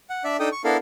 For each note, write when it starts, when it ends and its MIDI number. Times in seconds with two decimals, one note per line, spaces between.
0.10 0.23 78
0.24 0.37 62
0.24 0.37 74
0.24 0.37 76
0.40 0.49 62
0.40 0.49 63
0.40 0.49 69
0.40 0.49 79
0.40 0.49 87
0.52 0.62 85
0.64 0.77 59
0.64 0.77 62
0.64 0.77 64
0.64 0.77 69
0.64 0.77 70
0.64 0.77 77